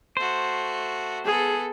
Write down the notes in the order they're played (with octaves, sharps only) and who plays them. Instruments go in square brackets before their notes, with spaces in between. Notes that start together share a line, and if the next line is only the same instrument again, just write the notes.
[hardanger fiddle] A3 F#4 [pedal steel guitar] C5
[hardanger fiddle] B3 A4 [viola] G#4